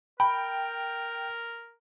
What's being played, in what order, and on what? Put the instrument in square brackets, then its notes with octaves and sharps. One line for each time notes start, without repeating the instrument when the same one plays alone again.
[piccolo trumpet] A#4 [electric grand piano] G5 [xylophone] B5